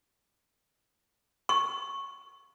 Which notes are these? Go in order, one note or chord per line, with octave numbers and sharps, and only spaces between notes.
C#6